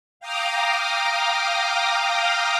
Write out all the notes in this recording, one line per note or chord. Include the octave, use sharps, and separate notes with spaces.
F5 G5 A#5 D6 D#6 F6